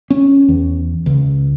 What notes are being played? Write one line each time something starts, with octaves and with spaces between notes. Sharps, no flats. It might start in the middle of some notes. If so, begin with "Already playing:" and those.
C#4
E2
C#2